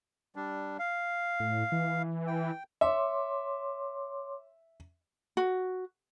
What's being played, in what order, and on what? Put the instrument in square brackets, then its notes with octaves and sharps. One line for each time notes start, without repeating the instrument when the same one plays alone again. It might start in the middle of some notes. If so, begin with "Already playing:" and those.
[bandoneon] G3 D4
F5
[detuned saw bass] A2
E3
[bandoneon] G5
[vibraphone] C#5 C6 D6 [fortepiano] E5
[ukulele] F#4